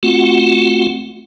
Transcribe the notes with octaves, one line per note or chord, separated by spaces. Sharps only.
A3 C4 F4 F#4 F#5